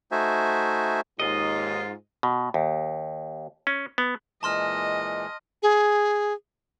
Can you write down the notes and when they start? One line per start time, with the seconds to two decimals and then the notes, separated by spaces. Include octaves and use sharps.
0.11 A3 D#4 F#4 C5 E5 G#5
1.20 D#2 G#2 F4 D#5
2.23 B2
2.54 D#2
3.67 C#4
3.98 B3
4.43 A#2 E3 G#3 D#5 A5 C6 F6
5.63 G#4